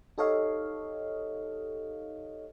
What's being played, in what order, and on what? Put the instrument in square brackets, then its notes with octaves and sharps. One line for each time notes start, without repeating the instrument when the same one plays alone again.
[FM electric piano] D#4 G4 A4 C#5 D#5 F5